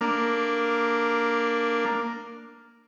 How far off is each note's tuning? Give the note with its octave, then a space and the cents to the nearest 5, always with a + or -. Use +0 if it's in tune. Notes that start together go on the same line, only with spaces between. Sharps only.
A#3 +0 D4 +0